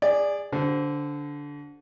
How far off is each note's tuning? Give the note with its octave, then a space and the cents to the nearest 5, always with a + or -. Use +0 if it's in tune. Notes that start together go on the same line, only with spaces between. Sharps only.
G#4 -25 D5 +0 G#5 +0
D3 -15 F#4 +45 C5 -10